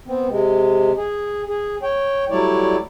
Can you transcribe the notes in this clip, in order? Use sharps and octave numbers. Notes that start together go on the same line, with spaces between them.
B3 C4
C3 G#3
G#4
G#4
C#5 G5
F#3 G3 A3 E4 C#5 D5